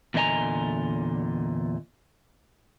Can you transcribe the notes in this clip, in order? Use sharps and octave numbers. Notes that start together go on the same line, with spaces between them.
E2 A#2 D3 D#5 G#5 A#5